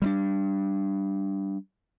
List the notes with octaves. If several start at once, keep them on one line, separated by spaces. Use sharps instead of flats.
G3 A3 D4